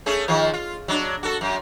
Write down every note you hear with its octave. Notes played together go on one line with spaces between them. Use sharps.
A3 C#4 G#4
D#3 F3 F4
F4
F#3 D4
F#4 A4
F#2